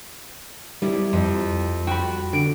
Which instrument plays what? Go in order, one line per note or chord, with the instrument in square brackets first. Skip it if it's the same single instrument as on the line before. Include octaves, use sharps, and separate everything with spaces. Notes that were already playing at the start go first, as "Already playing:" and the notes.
[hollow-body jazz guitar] G3 E4
[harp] F2
[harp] F#4 [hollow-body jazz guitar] G5 B5
[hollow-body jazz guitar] D3 [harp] D7